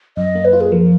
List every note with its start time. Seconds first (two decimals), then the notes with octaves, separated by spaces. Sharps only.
0.17 F#2 D#5
0.35 A#3
0.45 B4
0.53 F4
0.61 G#4
0.72 F3 A#4